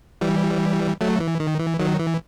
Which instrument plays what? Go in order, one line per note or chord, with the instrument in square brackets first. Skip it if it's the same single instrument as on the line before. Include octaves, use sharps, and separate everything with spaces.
[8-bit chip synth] E3 G3
F#3 A3
E3
D#3
E3
D#3 F#3
E3